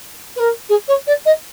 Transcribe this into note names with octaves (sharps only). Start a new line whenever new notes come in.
B4
A#4
G#4
C#5
D5
D#5